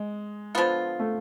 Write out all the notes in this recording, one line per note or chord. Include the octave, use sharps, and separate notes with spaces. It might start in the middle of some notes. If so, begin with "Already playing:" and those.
Already playing: G#3
D3 F3 B3 F4
A3